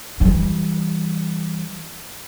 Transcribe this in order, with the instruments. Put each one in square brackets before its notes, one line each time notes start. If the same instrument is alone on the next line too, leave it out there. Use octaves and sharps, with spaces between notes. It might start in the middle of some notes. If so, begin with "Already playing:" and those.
[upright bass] E3 G3